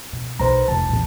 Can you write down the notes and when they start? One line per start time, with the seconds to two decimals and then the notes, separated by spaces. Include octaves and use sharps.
0.13 B2
0.40 B1 B4 C5 A#5
0.68 F1 C2 F2 A5
0.89 A#2 E3